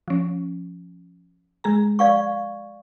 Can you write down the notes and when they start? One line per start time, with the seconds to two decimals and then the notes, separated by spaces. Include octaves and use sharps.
0.08 F3 C#4
1.64 G#3 G#4 A#5
1.99 D5 F5 C#6